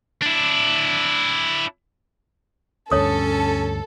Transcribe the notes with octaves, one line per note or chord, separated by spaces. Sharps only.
D4 E4
D2 G2 C#4 A4 C#5 D#6